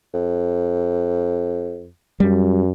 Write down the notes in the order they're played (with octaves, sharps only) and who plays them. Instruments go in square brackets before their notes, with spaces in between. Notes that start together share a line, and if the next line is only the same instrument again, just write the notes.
[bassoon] F2
[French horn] F#2 [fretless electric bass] G3